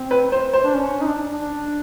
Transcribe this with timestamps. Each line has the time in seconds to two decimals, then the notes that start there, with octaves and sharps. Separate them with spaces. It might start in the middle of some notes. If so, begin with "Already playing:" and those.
Already playing: C4
0.11 B4
0.32 C5
0.53 C5
0.64 D4
0.76 C#4
1.02 D#4
1.07 D4
1.39 D4